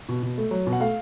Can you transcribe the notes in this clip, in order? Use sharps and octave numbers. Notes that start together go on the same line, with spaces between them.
B2
B2
A3
F#3
B2
F#5
A3 F5